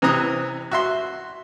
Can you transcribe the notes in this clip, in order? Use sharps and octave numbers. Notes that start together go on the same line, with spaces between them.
C3 E3 C4 A#5 D#6 F#6
F#4 E5 C6